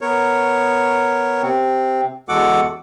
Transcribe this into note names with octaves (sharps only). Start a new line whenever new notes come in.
B3 A#4 C#5
C3 C4
E2 G#3 F#4 A4 F#5 D6